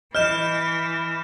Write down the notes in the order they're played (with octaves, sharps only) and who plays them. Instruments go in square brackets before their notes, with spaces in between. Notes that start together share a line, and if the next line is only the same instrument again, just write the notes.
[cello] E3 [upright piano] D#5 [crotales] F6 G6 E7